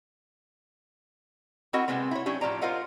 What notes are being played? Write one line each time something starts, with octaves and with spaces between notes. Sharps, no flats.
C4 E4 F#4 A#4 D#5 F#5
C3 D#3 G3 G#3 B3 C4
E4 C#5
F#3 C#4 D4 G4
A2 F3 D5 A#5
F4 A#4 C5 D#5 F5 F#5